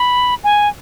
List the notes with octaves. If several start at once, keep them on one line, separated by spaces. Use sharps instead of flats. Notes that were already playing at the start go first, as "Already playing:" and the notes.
Already playing: B5
G#5